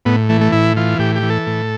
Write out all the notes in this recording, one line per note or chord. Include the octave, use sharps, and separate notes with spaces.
A2 B3
E3 A3
A3
A2 E4
E3 F4
A2 G4
G4
E3
A4
A2